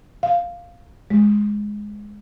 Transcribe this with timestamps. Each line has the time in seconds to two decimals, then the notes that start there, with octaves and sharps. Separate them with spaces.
0.23 F5
1.10 G#3